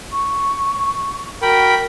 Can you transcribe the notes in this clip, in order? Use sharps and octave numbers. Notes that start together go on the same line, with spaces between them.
C#6
F#4 A#4 G5 B5